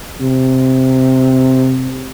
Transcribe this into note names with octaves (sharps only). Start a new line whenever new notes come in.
C3